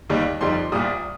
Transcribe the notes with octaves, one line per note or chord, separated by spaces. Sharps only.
D#2 D#3 G3
F2 D#3 G3 C6
C2 A#2 G3 D#6